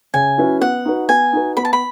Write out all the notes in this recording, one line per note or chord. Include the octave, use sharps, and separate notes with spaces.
C#3 G#5
F#3 C#4 E4 B4
B3 F#5
D#4 F#4 B4
B3 G#5
D#4 F#4 B4
B3 B5
A5
B5